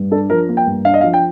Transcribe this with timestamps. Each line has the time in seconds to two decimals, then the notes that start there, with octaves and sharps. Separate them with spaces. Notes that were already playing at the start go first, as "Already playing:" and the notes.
Already playing: G2
0.11 D4 A4
0.30 F3 A#4
0.49 A#3
0.57 G5
0.66 G2
0.85 D4 F5
0.94 D#5
1.01 F3 F5
1.14 G5